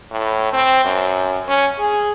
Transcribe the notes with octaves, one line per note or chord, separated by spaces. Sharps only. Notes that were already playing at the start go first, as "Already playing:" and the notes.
A2
C4
F#2
C#4
G#4